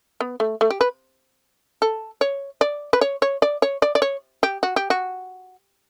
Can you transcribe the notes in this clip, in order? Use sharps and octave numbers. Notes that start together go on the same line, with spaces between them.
B3
A3
A3
G4
B4
A4
C#5
D5
B4
C#5
C#5
D5
C#5
D5
D5
C#5
G4
F#4
G4
F#4